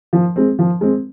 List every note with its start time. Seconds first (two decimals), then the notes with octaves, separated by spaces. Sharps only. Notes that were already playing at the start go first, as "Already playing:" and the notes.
0.13 F3
0.36 G#3 C4
0.59 F3
0.81 G#3 C4